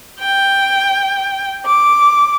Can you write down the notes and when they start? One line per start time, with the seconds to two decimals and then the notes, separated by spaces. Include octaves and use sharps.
0.20 G5
1.66 D6